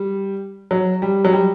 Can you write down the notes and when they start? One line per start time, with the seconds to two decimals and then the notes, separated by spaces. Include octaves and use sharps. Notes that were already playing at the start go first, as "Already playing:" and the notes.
Already playing: G3
0.71 F#3
1.02 G3
1.25 F#3
1.33 G3